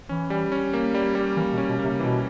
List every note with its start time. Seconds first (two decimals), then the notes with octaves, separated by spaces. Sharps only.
0.09 E3 C#4
0.30 G3
0.52 C#4
0.74 A#3
0.94 G3
1.15 G3
1.36 E3 A#3
1.52 B2
1.58 C#4
1.68 B2
1.79 C3 A#3
2.00 B2 E3